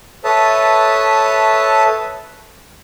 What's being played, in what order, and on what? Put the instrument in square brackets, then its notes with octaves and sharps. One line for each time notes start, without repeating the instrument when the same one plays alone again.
[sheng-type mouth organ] A4 B4 C#5 E5 A5 D#6